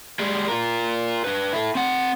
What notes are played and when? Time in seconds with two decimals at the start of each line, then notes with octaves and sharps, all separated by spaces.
0.20 G3 G#3
0.48 F4 A#4
1.24 D4 B4
1.53 E4 A4
1.75 C4 F#5